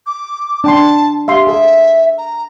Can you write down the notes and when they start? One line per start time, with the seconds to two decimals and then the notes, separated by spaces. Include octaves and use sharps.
0.07 D6
0.64 D4 G5 A5 C6
1.28 G4 E5 F5 C6
1.47 G#4 A4 E5
2.18 A#5